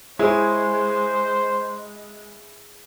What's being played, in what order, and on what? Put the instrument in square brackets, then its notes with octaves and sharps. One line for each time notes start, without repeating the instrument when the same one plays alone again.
[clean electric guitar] G#3 [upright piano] E4 [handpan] G#4 C#5 [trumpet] C5